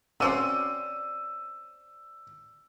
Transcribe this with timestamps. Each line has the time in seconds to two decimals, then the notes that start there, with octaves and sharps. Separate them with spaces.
0.20 C4 C#4 F#4 C5 D5 E6 D#7